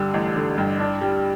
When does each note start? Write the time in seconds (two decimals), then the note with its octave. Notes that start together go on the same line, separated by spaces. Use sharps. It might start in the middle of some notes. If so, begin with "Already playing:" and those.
Already playing: G2 D3 G3
0.14 A1
0.36 D3
0.58 G2
0.80 D4
1.01 G3